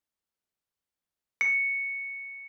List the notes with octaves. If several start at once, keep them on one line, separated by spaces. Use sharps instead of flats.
C#7